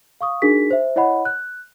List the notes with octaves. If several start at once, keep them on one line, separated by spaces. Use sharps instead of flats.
F5 C#6 D#6
D4 D#4 F#4 G#4 A#4 B6
C5 E5
E4 C#5 D#5 F#5 B5
F#6